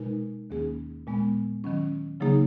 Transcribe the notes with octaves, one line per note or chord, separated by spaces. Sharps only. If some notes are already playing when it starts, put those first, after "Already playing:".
Already playing: B2 G#3 D#4 A#4
D#2 D#3 A#3 C#4 G#4
A#2 G#3 B3
D#3 F#3 C#4
C#3 F#3 A#3 D#4 G#4